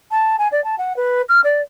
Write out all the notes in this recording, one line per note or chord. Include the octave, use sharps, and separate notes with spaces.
A5
G#5
D5
A5
F#5
B4
F6
D5